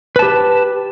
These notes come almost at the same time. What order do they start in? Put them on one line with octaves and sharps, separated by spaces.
B4 A5 G4